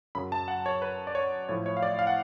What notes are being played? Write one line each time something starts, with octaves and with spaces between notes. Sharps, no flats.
F#2 C#3 F#3 B5
A5
F#5
C#5
B4
D5
C#5
A2 F3 A3 C#5
C#5
F5
D5
F5
F#5